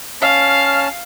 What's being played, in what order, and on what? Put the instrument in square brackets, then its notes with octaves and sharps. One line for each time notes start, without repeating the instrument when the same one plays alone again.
[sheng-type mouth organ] C#4 A5 [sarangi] F5